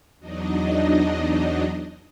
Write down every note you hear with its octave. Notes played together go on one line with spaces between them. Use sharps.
E2 F#3 D4 D#4 D#5